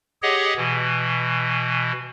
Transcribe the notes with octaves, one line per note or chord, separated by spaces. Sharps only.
G4 G#4 C#5 D#5 F#5
B2 E3